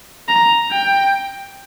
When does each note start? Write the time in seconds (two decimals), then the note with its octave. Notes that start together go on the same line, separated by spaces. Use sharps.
0.28 A#5
0.72 G5